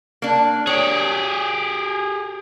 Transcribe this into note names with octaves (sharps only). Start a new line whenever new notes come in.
A#3 D4
G4 G#4 C#5